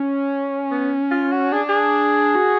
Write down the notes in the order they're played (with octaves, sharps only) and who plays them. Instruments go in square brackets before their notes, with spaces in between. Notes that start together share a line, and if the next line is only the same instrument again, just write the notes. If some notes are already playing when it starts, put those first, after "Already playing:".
Already playing: [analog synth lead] C#4
[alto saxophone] B3
F4
F#4
[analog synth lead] D4 [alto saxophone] G#4
[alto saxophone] G#4
[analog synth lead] F#4